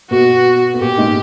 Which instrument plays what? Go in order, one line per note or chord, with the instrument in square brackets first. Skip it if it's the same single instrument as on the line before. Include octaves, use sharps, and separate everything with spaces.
[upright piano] B2 B3 [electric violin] F#4
[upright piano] B3
[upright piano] A#2 A#3 [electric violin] G4
[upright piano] G#2 G#3